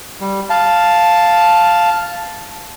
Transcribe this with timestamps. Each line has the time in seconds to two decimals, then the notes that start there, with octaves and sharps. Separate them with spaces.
0.21 G3
0.50 F5 A5